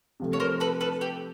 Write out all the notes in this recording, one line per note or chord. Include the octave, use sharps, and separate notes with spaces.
C3 F3 A3
C#5
A#4 C5
A4 B4
A4 B4
G4 A4